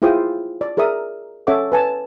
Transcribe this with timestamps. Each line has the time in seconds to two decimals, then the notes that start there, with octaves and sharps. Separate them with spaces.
0.02 E4 F4 G#4 C5 G5 D#6
0.61 D5
0.77 G#4 A#4 D5 E5 D#6
1.47 C#4 A4 C#5 E5 F#5 D6
1.72 B4 G#5 A5